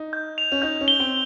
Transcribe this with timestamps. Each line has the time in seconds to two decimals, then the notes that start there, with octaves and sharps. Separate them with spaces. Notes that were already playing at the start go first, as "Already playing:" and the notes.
Already playing: D#4
0.13 G6
0.38 F7
0.52 C#4
0.62 D#4 G6
0.81 C#4
0.88 G7
1.00 C4